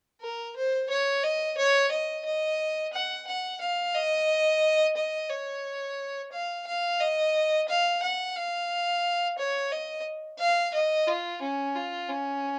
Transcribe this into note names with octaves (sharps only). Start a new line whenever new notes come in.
A#4
C5
C#5
D#5
C#5
D#5
D#5
F#5
F#5
F5
D#5
D#5
C#5
F5
F5
D#5
F5
F#5
F5
C#5
D#5
F5
D#5
F4
C#4
F4
C#4